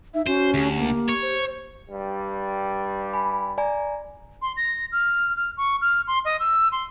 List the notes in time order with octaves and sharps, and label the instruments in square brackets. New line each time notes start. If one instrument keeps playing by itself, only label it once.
[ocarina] D#4 [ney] E5
[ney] C#4 [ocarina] F#4 [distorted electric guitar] C5
[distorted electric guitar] D2 [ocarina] G4
[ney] A#3
[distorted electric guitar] C#5
[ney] C5
[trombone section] G2 G3
[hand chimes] G#5 B5
D5 G#5 A#5
[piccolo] C6
A#6
F6
F6
C#6
F6
C6
D#5
E6
C6